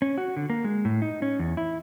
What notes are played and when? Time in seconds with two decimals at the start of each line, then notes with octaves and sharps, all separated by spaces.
0.02 C#4
0.18 F#4
0.37 D3
0.50 A#3
0.64 G#3
0.85 A2
1.02 D#4
1.22 C#4
1.39 E2
1.57 E4